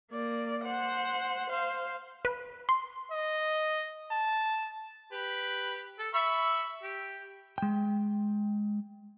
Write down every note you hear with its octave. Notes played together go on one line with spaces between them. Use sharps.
A#3 D5
C5 F#5
C5 F5
B4
C6
D#5
A5
G4 B4
A4
E5 B5 C#6
G4
G#3 G5